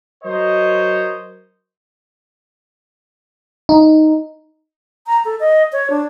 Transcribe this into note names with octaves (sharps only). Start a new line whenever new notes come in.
F#3 A#4 C5 C#5 D#5
D#4
A#5
A4
D#5
C#5
D4